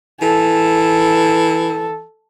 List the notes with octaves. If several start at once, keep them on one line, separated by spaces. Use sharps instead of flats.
E3 A4